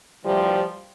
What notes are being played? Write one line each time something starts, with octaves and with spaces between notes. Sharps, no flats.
D2 C3 E3 F3 G3